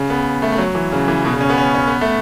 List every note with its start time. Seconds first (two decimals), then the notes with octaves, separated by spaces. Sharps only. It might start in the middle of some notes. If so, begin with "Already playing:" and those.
Already playing: C#3
0.10 B3
0.42 A3
0.52 A3
0.58 F#3
0.75 E3
0.92 C#3
1.08 E3
1.25 B2
1.33 C#3
1.41 C#4
1.50 B3
1.58 C#4
1.74 C#4
1.88 B3
2.01 A3